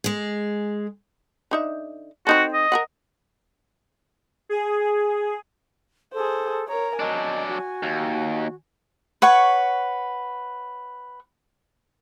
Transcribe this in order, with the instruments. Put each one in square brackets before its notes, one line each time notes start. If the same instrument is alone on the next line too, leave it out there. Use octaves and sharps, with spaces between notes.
[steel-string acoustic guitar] G#3 G#4
[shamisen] D3 D#4 E5
[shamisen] C4 D#4 A4 [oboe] F#4
[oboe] D#5
[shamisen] A#4 B4 F#5
[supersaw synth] G#4
[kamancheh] G#4 C5 [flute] A4
[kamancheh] A#4 C#5 [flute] A#5
[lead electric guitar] F#3 D4 [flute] D#5 [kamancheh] G#5
[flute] F#4
[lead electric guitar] D#2
[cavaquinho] B4 C#5 F#5 C#6